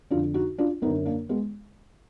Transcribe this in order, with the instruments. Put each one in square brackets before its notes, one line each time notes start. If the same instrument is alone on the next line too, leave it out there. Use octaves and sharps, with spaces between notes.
[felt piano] F2 D3 D4 F4
D#4 F#4
D4 F4
F#2 B3 D#4
D3
A#3 D4
G#3 B3